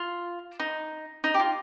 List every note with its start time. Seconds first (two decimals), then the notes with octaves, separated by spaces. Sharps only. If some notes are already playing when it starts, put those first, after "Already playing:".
Already playing: F4
0.60 D#4
1.24 D#4
1.34 G4
1.40 F4